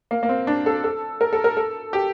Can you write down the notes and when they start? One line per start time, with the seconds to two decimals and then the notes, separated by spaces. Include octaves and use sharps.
0.11 A#3
0.23 A#3
0.29 C4
0.47 D4
0.66 A4
0.84 A4
1.21 A#4
1.33 A4
1.44 A#4
1.57 A4
1.93 G4